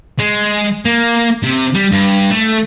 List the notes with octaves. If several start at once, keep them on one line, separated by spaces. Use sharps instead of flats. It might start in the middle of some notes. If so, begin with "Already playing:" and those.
G#3
A#3
C3
G3
G2
A3